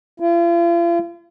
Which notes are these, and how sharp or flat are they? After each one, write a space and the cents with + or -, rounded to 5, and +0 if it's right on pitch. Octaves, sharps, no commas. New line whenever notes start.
F4 -45